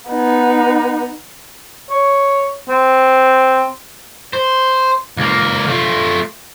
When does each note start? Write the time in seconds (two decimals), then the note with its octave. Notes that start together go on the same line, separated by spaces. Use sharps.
0.10 B3 D#4
1.90 C#5
2.69 C4
4.33 C5
5.17 C#2 A#3
5.67 A3 F4